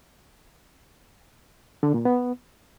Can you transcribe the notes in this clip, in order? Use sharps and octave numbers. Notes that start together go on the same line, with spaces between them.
D3
A#2
B3